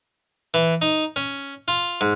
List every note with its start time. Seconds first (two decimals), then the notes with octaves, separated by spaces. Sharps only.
0.54 E3
0.82 D#4
1.16 C#4
1.68 F4
2.01 G#2